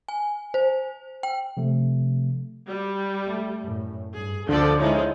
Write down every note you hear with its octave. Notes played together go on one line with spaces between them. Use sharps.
G#5
C5
G5
C3 F3 A3
G3
A3
F#2 A2
G2 G#4
D2 D3 F3 A4 D5
F3 G#3 D#4 E4 C#5